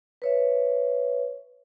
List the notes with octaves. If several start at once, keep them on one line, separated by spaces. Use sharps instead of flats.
B4 C#5 E5